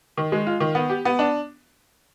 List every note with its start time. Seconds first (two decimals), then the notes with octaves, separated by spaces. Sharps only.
0.17 D#3
0.32 G#3
0.47 F4
0.60 D#3
0.75 B3
0.90 G4
1.05 B3
1.19 D4